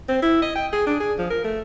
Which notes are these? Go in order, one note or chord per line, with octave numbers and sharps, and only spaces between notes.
C4
E4
D#5
G5
G#4
D4
G#4
F3
A#4
A3